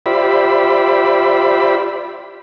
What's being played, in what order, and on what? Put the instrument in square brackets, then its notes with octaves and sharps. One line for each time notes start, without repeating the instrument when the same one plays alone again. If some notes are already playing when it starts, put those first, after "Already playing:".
[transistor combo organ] F4 G4 C5 D5 E5 B5